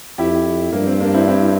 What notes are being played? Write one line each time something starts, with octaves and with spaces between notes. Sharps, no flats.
F2 E4 G4
G2 A#3
C4
A#3 D4
C4 E4
C4 E4